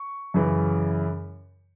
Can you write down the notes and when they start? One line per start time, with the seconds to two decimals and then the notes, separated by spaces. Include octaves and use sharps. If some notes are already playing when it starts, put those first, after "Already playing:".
Already playing: C#6
0.34 F#2 C#3 E3